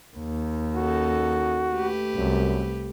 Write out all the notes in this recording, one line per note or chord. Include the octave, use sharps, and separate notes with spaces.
D#2
C#4 D#4 F#4 A4
A3 G4 B4
C2 F#2